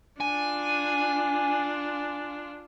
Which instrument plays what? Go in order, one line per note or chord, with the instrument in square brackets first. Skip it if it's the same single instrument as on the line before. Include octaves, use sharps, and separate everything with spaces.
[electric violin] D4 F4 [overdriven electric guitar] G#5